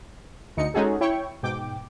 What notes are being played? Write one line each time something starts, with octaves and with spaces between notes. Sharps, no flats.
D2 D#4 C#7
G#3 C#4 D#4 F#4 G#4 A4
E4 C#5 G5 C#6
G#2 B2 G5 D6